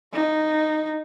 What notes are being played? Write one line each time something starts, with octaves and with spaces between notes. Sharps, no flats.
D#4